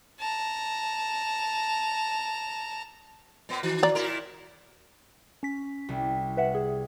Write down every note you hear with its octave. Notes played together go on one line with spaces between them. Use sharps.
A5 A#5
A#2 B3
D#3 F#4
D5 A#5
A#2 E4 A#4
C#4 B6
C2
B4 E5 F#5
G#4